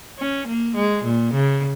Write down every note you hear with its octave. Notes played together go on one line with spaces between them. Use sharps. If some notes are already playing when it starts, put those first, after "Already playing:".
C#4
A#3
G#3
A#2
C#3